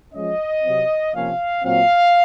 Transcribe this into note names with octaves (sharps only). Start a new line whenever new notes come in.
F3 G#3 C#4 D#5
C3 F#3 C4
C3 F3 A#3 C#4 F5
A#2 F#3 C4 F5